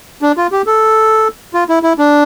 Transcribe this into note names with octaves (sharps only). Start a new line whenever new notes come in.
D4
F4
G4
A4
F4
E4
E4
D4